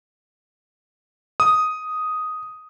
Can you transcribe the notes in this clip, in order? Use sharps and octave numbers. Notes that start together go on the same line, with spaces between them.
D#6